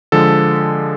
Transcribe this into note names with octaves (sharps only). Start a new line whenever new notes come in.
D3 F3 G#3 A4